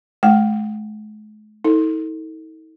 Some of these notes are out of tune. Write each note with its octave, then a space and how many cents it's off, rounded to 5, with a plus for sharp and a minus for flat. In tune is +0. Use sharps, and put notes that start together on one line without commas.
G#3 +45 G5 -20
D#4 +45 A4 +15